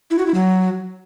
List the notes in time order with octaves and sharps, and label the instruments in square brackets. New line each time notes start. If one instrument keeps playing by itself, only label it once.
[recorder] E4
F#4
E4
F#3